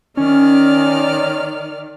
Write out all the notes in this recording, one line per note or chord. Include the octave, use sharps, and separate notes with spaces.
D#3 C#4 D5 F6